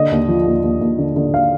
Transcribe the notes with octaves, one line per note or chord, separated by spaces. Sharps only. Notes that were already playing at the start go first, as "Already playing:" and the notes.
Already playing: D3 D#5
D#2
F3
D#2
D#2
D#2
D3
D3
F5